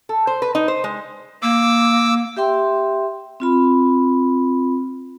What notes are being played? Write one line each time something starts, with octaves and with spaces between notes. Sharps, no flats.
A4
C5
B4
D#4
C5
G#3
A#3 D6 E6
G4 E5 G5 C6
C4 F4 B5